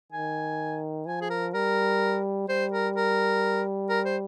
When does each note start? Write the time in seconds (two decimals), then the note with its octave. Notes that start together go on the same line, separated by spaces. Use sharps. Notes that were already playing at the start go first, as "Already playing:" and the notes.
0.12 D#3 G#5
1.06 F3 G#5
1.21 G#4
1.30 A#4
1.54 G3 A#4
2.48 G3 C5
2.72 A#4
2.96 A#4
3.90 A#4
4.06 C5